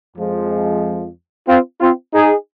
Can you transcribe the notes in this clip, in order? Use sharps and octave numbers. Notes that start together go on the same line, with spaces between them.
F2 F3 G#3
C4 F4
C4 F4
D#4 G#4